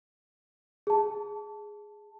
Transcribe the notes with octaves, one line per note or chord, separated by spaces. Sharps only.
G#4 A5